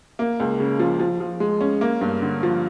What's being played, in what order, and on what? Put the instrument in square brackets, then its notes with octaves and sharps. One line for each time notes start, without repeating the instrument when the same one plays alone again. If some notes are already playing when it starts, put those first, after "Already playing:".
[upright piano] A#3
C#2
C#3
F3
F3
F3
G#3
C#4
A#3
G2
D3
F3